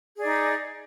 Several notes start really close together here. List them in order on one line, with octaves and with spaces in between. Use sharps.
G#4 D5 D#4